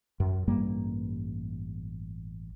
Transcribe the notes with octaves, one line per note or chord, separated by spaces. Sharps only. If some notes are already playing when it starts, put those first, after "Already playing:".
F#2
A1 G2 G3 A#3